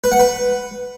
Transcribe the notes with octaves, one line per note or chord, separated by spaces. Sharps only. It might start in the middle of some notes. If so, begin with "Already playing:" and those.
B4
F#5
B4